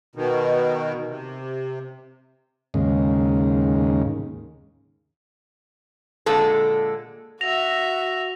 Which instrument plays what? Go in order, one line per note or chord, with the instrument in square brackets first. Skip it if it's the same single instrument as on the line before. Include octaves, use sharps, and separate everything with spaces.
[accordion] B2 D#3
C3
[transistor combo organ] D#2 G#2 C#3
[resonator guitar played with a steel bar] A#2 D3 G#3 A4
[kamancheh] F#4 E5 [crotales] A#6 F7